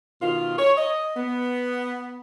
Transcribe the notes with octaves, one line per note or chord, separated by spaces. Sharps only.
B2 D#3 F4
C#5
D#5
B3